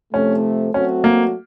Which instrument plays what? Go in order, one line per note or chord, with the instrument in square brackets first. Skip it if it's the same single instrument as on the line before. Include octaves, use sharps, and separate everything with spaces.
[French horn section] C3 F3 A3 [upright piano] C#4
[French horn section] F#3 A3 C4 F#4 [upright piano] C#4
[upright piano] A#3